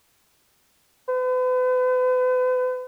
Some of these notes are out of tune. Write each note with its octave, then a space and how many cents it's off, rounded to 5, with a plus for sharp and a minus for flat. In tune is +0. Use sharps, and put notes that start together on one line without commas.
B4 +40